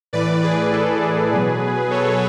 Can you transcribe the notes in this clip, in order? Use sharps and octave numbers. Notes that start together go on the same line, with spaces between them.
A2 E3 B4 D5
G#4 B4
A4
G#4
B2 F#3 G#4 B4
A4 C#5